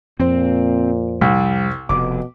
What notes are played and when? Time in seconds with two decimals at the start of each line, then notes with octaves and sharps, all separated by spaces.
0.20 F2 A#2 F3 C4 C5
1.21 C2 G3
1.89 F1 B2 D6